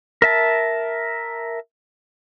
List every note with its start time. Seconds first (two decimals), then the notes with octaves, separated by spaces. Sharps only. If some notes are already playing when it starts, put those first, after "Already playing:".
0.22 A#4 E5 A5